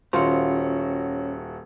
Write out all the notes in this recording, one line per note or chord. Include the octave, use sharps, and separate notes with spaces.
D#1 C#4 F4 F#4 C5 C#5